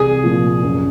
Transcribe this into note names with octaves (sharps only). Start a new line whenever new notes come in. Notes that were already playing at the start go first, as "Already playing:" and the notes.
Already playing: C2 G#4
A#2 F3
F#2